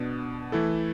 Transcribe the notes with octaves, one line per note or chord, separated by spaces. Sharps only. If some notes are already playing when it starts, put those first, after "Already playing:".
Already playing: B2 B3 D4
E3 A3 E4 A4